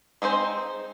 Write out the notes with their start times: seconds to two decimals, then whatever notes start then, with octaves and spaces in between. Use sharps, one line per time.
0.22 G#3 C4 D#4 C5